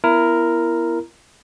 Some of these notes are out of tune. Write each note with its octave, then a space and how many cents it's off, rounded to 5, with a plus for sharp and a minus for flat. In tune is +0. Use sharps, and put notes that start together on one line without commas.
B3 +0 E4 +20 A#4 +0